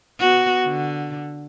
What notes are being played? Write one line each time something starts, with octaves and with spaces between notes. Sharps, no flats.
B3 F#4
D3